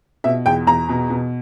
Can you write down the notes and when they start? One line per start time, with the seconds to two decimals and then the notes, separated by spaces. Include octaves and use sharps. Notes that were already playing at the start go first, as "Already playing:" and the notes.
0.24 B2 E5
0.46 E2 G5
0.67 E2 A#5
0.89 B2
1.10 B2